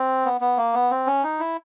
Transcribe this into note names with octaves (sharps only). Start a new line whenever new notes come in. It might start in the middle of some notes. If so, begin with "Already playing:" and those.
Already playing: C4
B3
B3
A#3
B3
C4
C#4
D#4
E4